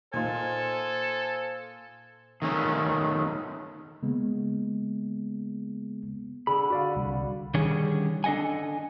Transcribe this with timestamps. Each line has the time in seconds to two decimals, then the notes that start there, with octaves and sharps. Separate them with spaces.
0.14 A#2 D#4 F4 A4 C5 G#5
2.42 D#3 A3 C#4
4.03 C#3 G#3 A#3 B3
6.47 D3 G#4 B5
6.70 F#4 D5 F5
6.96 C2
7.54 D3 D#3 G3 C#4 G#4 C#5
8.24 D4 A4 D#5 F#5 G#5